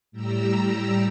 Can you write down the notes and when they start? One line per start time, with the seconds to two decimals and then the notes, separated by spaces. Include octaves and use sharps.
0.12 A2 G3 G4 A#5 E6